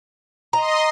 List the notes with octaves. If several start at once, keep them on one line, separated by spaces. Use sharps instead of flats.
D#5 A#5 C6